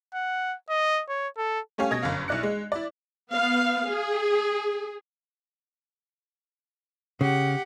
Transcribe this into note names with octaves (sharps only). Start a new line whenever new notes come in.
F#5
D#5
C#5
A4
A3 C#4 G4 C#5 F5 G#5
B2 D#5 G#6 A#6
G1 F#2 C#4 F5
B1 E4 D5 F#6 C#7
G#3
E4 D5
B3 F5
G#4
C#3 G4 F#5